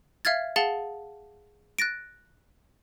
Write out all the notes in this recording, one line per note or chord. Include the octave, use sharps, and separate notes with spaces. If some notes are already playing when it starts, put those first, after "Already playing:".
E5 F5 F6 G#6 A6
G#4 F5 F#5 A5 A6 G7
F#6 A6 A#6 D7